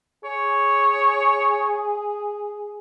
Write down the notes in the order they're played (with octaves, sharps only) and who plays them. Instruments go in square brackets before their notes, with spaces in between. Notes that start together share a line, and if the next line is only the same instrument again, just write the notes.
[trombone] G#4 [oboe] C#5